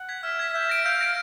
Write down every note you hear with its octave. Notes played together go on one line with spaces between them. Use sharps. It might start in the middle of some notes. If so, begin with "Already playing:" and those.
Already playing: F#5
G#6 B6
E5 F6
G#6 B6
E5 G6
A#6 D7
F5 G6
A#6 D7